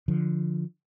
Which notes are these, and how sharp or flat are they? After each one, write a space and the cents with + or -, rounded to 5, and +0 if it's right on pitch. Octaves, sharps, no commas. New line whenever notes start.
D3 +0 F3 +0